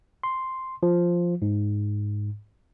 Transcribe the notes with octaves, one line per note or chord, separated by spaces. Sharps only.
C6
F3
G#2